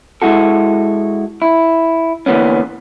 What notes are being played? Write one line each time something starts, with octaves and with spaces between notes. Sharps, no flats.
G#3 E4 F#4 A4
E4
D3 E3 A#3 B3 C#4